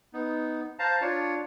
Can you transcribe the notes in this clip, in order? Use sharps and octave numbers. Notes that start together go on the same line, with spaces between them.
B3 D#4
C5 F5 A5 A#5
D4 F4 C#5